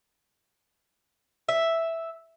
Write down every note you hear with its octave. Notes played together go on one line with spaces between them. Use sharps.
E5